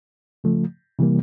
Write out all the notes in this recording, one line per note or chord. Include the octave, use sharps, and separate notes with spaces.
C#3 F3 A3
C3 E3 G3 A#3